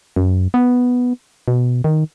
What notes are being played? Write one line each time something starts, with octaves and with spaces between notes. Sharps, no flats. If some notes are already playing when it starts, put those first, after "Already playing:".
F#2
B3
B2
D#3